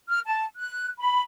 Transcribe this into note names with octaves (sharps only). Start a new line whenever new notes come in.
F6
A5
F#6
B5